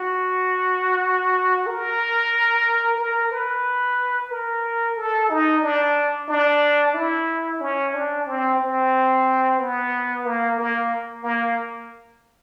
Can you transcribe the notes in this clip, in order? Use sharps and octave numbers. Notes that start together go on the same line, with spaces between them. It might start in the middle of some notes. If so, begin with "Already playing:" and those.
Already playing: F#4
A#4
A#4
B4
A#4
A4
D#4
D4
D4
E4
C#4
D4
C4
C4
B3
A#3
A#3
A#3